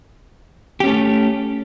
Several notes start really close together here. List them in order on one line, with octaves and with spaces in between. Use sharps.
G4 C#4 A3